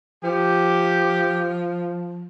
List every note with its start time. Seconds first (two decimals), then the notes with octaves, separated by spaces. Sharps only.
0.24 F3 G4